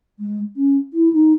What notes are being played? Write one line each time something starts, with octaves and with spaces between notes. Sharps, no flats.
G#3
C#4
E4
D#4